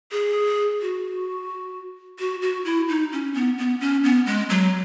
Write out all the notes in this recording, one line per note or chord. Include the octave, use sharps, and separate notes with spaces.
G#4
F#4
F#4
F#4
E4
D#4
C#4
B3
B3
C#4
B3
G#3
F#3